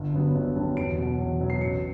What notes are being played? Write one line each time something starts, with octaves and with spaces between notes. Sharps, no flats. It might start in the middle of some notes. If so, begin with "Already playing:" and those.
Already playing: G1
G2 D3 F#3 B3
G1
G2 D3 F#3 B3
E2 D7
B2 F#3
E2
B2 F#3
C7
A1 C#7